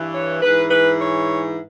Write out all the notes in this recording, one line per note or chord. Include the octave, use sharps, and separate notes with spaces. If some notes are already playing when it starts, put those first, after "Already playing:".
Already playing: G2 E3
C#5
G#2 E3 B4
B4
C#5